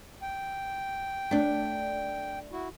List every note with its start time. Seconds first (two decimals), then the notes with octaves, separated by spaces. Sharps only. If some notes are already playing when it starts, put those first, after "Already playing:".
0.22 G5
1.31 A3 D4
2.52 E4 F#4